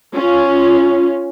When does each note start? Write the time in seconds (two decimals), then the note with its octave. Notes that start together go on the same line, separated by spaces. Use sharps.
0.14 C#4 F4